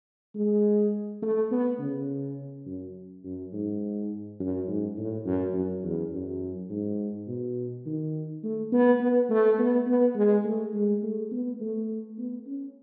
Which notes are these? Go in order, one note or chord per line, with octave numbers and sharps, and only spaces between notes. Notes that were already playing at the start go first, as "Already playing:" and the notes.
G#3
A3
B3
C#3
F#2
F#2
G#2
F#2
G#2
A2
F#2
F#2
E2
F#2
G#2
B2
D#3
A3
B3
B3
A3
B3
B3
G#3
A3
G#3
A3
B3
A3
B3
C#4